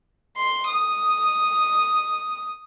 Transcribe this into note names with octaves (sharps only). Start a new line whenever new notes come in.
C6
D#6